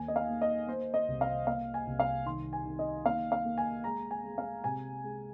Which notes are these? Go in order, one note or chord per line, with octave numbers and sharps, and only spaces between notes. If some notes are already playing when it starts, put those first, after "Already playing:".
Already playing: D#2 A#3 G#5
D#5
F5
A#3
D#5
A#3 C5
D#5
C2
F5
A#3 F5
G#5
C2
F5
D#3 C6
G#5
D#3
D#5
A#3 F5
F5
A#3
G#5
G#3 A#5
G#5
G#3
F5
C3 G#5
G#3